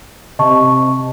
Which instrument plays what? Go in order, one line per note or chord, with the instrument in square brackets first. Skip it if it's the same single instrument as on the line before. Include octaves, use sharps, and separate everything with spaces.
[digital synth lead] C3 [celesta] D#5 A5 C#6